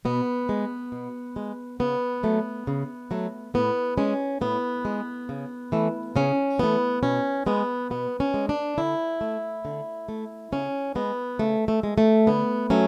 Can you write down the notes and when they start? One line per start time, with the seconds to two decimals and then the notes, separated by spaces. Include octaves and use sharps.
0.05 B2 B3
0.49 G#3
0.92 B2
1.36 G#3
1.80 C#3 B3
2.23 F#3 A3
2.67 C#3
3.11 F#3 A3
3.54 A2 B3
3.98 G#3 C#4
4.41 A2 B3
4.85 G#3
5.29 C#3
5.72 E3 A3
6.16 C#3 C#4
6.59 E3 A3 B3
7.03 B2 C#4
7.47 G#3 B3
7.90 B2 B3
8.20 C#4
8.34 G#3
8.49 D4
8.78 D3 E4
9.21 A3
9.65 D3
10.09 A3
10.52 C#3 C#4
10.95 G#3 B3
11.39 C#3 A3
11.68 A3
11.83 G#3
11.98 A3
12.27 D3 B3
12.70 F#3 A3 C#4